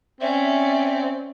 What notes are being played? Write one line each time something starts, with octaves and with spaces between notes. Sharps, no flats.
C4 C#4 D5 E5